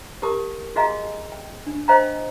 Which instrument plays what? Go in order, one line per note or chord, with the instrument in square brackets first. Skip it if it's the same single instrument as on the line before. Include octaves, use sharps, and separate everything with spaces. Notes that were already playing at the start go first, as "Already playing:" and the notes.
[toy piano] G4 A#4 A5 D6
F#4 G#4 D#5 F5 G#5 A#5
G5
D4
C5 D#5 F5 G5 G#5 A#5